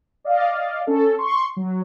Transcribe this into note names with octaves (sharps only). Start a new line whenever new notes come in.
D5 D#5 F5
C#4 A4
C6 C#6
F#3